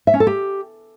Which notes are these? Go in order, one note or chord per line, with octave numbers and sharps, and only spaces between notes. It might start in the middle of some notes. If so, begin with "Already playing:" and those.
E5
C#4
A4
G4